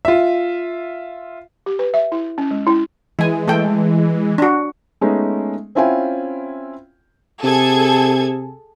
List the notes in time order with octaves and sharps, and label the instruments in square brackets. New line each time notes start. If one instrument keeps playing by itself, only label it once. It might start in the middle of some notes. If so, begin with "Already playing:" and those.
[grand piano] F4 E5
[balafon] G4
B4
E5
E4
C#4
G#3
E4
[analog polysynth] E3 G#3 [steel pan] E4 G#5
[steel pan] A3 A4 G5
D4 F#4
[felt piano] G#3 A3 B3 C#4 D#4 G#4
C4 C#4 E4 F4 G5 G#5
[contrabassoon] C3 [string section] G#4 A4 G#6